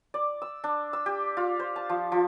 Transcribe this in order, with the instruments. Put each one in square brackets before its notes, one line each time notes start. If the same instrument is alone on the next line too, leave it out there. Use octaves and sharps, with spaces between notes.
[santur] D5
E6
D4
E6
G4
F4
C5
A5
F3
F3